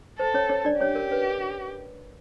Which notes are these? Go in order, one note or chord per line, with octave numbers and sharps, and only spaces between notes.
A4 C5
C#4 C#5
C#4 C#5
D4 D5
C#4 G4 C#5
A#4
B4